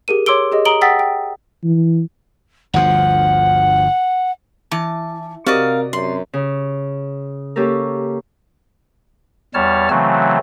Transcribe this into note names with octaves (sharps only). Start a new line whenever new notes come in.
G4 G#4 A#4 D#7
C#5 C6 D6 E6 D7 G7
G4 G#4 D#5
A#5 D#6 D7 F#7 G7
F#5 G5 D#6 E6 A6 B6
G5
E3
G1 D2 F3 F#5
E3 A5
C3 F#4 A#4 D5 D#5 F5
F#2 C6
C#3
A#3 C#4 G4 A4 A#4
E2 G3 C#5 A5 F6
C#3 E3 F#3 A3 C4